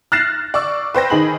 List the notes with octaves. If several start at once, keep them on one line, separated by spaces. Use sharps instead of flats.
F6 F#6 A6 A#6 C7 E7
D5 C#6 E6
B4 C5 G5 A#6
D#3 D#4 G#4 B5 F#7